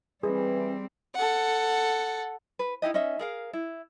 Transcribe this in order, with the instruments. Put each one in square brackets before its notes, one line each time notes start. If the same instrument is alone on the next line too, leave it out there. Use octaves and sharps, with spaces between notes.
[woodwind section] E3 [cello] G3 C4 [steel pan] G#4
[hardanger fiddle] A4 F#5
[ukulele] B4
D#4 E4 G4 D#5
C#4 D#4 D#5 E5
G#4 A#4 F5
E4